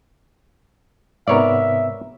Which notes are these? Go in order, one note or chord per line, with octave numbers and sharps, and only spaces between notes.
G#2 C3 B3 A#4 C#5 D5 E5